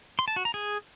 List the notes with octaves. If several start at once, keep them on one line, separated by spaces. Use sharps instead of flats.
C6
A5
F#4
A#5
G#4